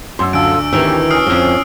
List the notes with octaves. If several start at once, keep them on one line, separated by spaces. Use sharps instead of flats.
F#2 C6 E6
D2 D3 D4 F4 A4 E6 D7
D#3 E3 A3 C4 G4 E6 D7
C#4 D#6 F6 C7
F2 G#2